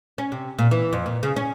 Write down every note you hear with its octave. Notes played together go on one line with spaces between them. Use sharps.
C#4
C3
A#2
E3
F2
A#2
C#3
C#4